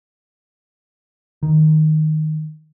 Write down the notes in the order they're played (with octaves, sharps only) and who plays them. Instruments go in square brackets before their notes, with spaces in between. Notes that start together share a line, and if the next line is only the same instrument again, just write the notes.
[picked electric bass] D#3